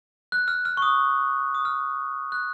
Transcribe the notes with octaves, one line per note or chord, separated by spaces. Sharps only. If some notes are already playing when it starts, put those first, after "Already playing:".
F#6
F6
F6
C#6
D#6
D#6
F6
F#6